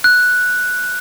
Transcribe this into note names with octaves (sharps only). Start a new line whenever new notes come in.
F#6